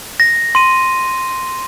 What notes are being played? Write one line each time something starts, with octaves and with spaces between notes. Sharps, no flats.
A#6
C6 D#7